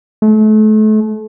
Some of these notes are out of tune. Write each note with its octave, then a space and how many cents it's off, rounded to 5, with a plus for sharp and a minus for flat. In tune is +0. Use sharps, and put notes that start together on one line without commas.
A3 -35